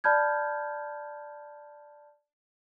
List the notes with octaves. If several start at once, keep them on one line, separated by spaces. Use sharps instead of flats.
D5 A5 B5 F6 G6 G#6